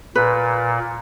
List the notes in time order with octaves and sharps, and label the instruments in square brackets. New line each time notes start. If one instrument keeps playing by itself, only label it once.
[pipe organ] A#2 [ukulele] B4